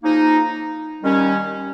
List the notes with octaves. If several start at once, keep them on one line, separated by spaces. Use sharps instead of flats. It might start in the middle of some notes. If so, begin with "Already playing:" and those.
C#3 F3 A#3 D#4
D#2 D#3 G3 C#4